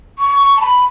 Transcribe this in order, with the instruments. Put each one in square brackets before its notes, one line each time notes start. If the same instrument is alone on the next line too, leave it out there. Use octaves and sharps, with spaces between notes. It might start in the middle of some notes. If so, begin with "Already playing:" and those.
[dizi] C#6
C#6
A5
B5